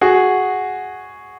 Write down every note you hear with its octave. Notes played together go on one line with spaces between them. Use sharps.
F#4 G#4